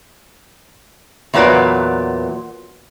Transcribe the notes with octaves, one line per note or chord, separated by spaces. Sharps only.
E2 A#2 F#3 B3 B4 D5